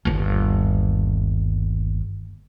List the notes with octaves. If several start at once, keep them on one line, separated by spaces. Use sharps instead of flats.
G1 D#2